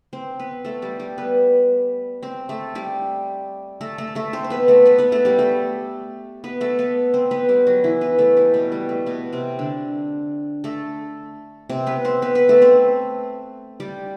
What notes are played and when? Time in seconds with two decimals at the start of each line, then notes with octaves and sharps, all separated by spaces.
0.13 C4 C5
0.39 B3 B4
0.65 A3 A4
0.82 G3 G4
1.00 G3 G4
1.18 B3 B4
2.23 C4 C5
2.49 A3 A4
2.75 G3 G4
3.81 A3 A4
3.98 A3 A4
4.15 A3 A4
4.33 C4 C5
4.44 C5
4.50 B3 B4
4.68 A3 A4
4.85 B3 B4
4.98 B3 B4
5.12 A3 A4
5.25 G3 G4
5.39 A3 A4
6.44 B3 B4
6.61 A3 A4
6.79 B3 B4
7.14 C4 C5
7.31 B3 B4
7.49 G3 G4
7.67 F#3 F#4
7.84 E3 E4
8.01 B3 B4
8.19 A3 A4
8.37 G3 G4
8.54 B2 B3
8.72 G3
8.89 A3
9.06 B2 B3
9.33 C3 C4
9.59 D3 D4
10.64 A3 A4
11.69 C3 C4
11.86 B3 B4
12.05 C4 C5
12.22 B3 B4
12.35 B3 B4
12.49 A3 A4
12.62 C4 C5
13.80 G3 G4